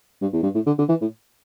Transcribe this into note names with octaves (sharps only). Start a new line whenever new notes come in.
G2
E2
G2
A2
D3
D3
E3
A2